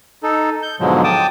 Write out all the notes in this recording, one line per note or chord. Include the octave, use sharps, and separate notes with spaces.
D#4 A4
G6
G#2 B2 D3 F3 F#3 G#3
G5 A5 D6 D#6